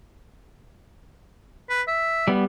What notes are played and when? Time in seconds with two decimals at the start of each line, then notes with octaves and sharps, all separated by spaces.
1.70 B4
1.88 E5
2.28 G3 B3